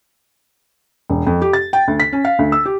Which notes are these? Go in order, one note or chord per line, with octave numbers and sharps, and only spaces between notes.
E1
F2
G4
A6
G5
D2
B6
C#4
F5
D2
E6
G4